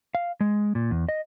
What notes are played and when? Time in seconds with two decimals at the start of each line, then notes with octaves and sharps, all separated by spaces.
0.15 F5
0.41 G#3
0.75 A#2
0.91 E2
1.09 D#5